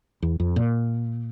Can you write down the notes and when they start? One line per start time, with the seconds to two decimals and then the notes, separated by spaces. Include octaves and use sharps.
0.22 E2
0.40 F2
0.56 A#2